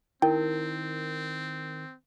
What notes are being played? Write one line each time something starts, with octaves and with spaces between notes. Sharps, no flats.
D#3 C4 E4 A#4 G5